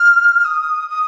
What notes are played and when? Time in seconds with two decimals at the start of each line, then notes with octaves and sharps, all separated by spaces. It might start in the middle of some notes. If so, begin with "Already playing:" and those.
Already playing: F6
0.44 D#6
0.88 D#6